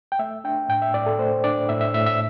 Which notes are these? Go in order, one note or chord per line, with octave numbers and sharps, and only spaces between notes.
G5
A3 E5
D4 G5
A2 G5
E5
A2 D5
A4
A3 C5
D4 D5
A2 E5
E5
A2 E5
E5